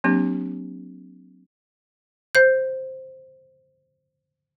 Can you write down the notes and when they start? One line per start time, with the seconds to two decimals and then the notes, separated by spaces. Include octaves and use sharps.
0.04 F#3 A#3 C4 D4 G4
2.35 C5 G6